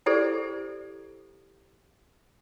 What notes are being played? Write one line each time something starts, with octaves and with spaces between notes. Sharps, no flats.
E4 G4 A4 C5 D5